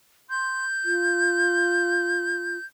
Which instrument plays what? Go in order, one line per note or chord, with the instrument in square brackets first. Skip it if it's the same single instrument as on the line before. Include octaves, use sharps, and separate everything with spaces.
[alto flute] C6 [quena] G6
[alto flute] F4